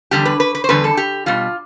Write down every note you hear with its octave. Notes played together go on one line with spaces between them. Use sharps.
E2 D3 G3 G4
B4
B4
B4
C5
E2 D3 G3 B4
A4
G4
B2 G3 F4